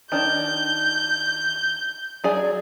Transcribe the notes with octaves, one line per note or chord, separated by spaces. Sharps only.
D#3 D4 G6
F#3 G#4 D5